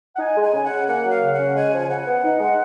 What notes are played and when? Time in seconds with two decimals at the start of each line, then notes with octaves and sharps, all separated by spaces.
0.16 F#5
0.19 D#4 G#5
0.36 G#3
0.42 G#5
0.53 C#3
0.64 F#5
0.70 C#3
0.88 A#3 F#5
1.05 F#3 F5
1.21 C#3
1.33 C#4 F#5
1.55 G#3 G#5
1.73 F3
1.89 C#3 F#5
2.07 B3
2.24 D#4
2.40 G#3